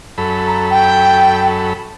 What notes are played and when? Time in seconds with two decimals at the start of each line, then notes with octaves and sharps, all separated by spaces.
0.18 F#2 A4 B5
0.47 A#5
0.70 G5